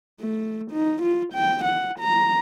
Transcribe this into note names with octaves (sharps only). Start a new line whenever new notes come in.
A3
D#4
F4
G5
F#5
A#5